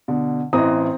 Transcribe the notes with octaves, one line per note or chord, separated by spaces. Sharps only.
B2 D3
A1 E3 C4 D#5 A#5 D#6